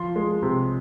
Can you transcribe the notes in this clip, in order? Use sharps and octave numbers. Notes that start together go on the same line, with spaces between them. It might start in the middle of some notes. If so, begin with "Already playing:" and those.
Already playing: F3 C6
G#3
C3